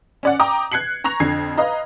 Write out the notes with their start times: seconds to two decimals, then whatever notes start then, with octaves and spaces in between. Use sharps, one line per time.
0.23 C#4 D5 F#5
0.40 G5 A#5 D6 D#6
0.72 F#6 G#6 C7 C#7 F#7
1.04 A#5 C#6 A#6 F7
1.20 F2 D3 G#6 C7
1.58 B4 D#5 F5 A#5